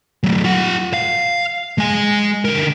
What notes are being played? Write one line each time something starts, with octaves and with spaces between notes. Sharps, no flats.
F#3 A3
F4 F#5
F5
G#3 G#5
D3 A#4